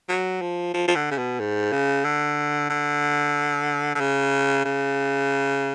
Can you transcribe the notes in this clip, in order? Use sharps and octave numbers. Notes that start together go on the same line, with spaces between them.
F#3
F3
F3
F3
D3
C#3
B2
G#2
C#3
D3
D3
D3
C#3
C#3